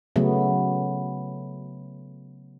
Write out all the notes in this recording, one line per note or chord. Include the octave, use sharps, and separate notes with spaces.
C#3 F#3 A3 B3